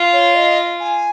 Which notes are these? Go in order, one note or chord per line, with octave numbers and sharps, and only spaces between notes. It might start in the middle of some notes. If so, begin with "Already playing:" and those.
Already playing: F4
C#5
D#5
G#5